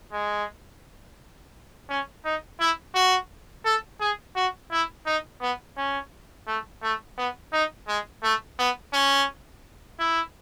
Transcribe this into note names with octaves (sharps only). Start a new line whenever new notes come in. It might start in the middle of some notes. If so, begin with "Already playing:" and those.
G#3
C#4
D#4
E4
F#4
A4
G#4
F#4
E4
D#4
B3
C#4
A3
A3
B3
D#4
G#3
A3
B3
C#4
E4